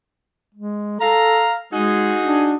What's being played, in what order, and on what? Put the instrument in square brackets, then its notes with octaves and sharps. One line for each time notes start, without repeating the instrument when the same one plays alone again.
[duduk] G#3
[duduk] A4 [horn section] F5 A#5
[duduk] G#3 [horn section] D#4 F#4 G#4
[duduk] D4